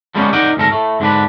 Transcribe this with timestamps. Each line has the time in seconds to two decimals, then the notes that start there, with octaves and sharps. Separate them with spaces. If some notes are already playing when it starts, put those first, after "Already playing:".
0.15 D3 G3 G#3 A#3 B3 C#4
0.33 D#4 A#4 D5 F#5 G5
0.57 D2 G#2 A4 A#4
0.72 A2 A3
1.00 G#2 D3 D4 B4